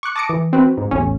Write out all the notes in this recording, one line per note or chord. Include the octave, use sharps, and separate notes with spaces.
C#6 D6 F#6 C#7
A5 D6 D#6 A#6 C#7 D7
E3
C4 F#4 B4
G#2
A1 E2 A2 C#4